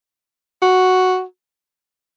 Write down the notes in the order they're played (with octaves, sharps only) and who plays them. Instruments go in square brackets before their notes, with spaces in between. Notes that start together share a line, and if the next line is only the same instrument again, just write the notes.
[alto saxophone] F#4